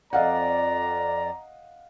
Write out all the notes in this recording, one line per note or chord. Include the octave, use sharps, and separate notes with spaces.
F2 D5 D#5 F5 F#5 A#5